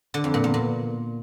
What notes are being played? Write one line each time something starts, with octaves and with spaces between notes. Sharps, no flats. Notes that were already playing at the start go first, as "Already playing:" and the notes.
D3
F2
A#2
E2
A#2